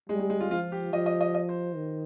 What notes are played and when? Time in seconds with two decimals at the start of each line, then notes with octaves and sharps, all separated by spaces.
0.09 G3 G#3
0.19 G#3
0.30 G#3
0.40 F4
0.51 F3 F4
0.72 G4
0.93 F3 D#5
1.06 D#5
1.21 D#5
1.34 D#5
1.49 C5
1.76 D#3